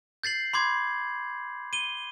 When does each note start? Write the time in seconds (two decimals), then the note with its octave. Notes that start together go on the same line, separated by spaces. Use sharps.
0.23 G6 A6 C7 F#7
0.53 B5 C6 D6 G#6
1.73 D#7 G7